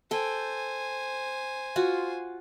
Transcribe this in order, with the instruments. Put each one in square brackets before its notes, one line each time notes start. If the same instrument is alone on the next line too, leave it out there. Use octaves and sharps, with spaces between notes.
[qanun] A4 G5 [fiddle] C5 G#5
[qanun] F4 F#4